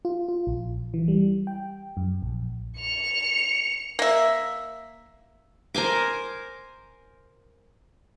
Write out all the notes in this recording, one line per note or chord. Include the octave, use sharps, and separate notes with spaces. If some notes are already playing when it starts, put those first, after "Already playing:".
F4
F4
A#1
E3
G3
G5
F#2
A#1
C#7 F7
A#3 E5
A#4 C5 G#5 D6